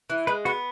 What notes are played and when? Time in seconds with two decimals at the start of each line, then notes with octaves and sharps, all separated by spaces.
0.10 E3
0.27 G#3 B4
0.45 B3 F#4